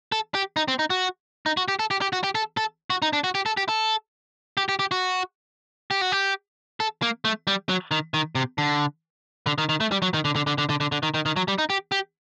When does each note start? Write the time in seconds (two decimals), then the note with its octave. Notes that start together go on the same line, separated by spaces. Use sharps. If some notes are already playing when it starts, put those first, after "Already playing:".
0.12 A4
0.35 G4
0.56 D#4
0.68 C4
0.79 D#4
0.90 F#4
1.46 D#4
1.57 F#4
1.68 G4
1.79 A4
1.91 G4
2.02 G4
2.13 F#4
2.24 G4
2.35 A4
2.57 A4
2.90 F#4
3.02 D#4
3.13 D4
3.24 F#4
3.35 G4
3.46 A4
3.57 G4
3.69 A4
4.57 G4
4.69 G4
4.79 G4
4.91 F#4
5.91 G4
6.01 F#4
6.12 G4
6.80 A4
7.02 A#3
7.25 A3
7.47 G3
7.69 F#3
7.91 D#3
8.14 D#3
8.35 C3
8.58 D3
9.47 D3
9.58 D#3
9.69 D#3
9.81 A3
9.92 G3
10.02 F#3
10.14 D#3
10.25 D3
10.36 D3
10.47 D3
10.58 D3
10.69 D3
10.81 D3
10.92 D3
11.03 D#3
11.14 D#3
11.26 D#3
11.36 F#3
11.48 G3
11.58 D#4
11.70 G4
11.92 G4